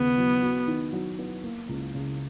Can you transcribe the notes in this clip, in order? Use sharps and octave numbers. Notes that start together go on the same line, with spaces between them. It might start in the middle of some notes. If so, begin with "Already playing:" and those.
Already playing: D#2 C#3 B3
F#3
F#4
D#3
F#3
B3
A#3
C#2
C#3